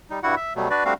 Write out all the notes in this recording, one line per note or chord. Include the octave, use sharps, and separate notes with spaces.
G3 D#4
G2 G3 E4 F#4 F#5
E5
B2 F#3 G3 A3
D4 F#4 B4 D5
G3 A3 C4 D4 F#4 F5